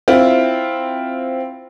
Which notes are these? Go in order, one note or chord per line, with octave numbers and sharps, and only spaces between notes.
C4 E4 F4